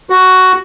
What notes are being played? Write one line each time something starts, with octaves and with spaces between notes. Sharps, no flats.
F#4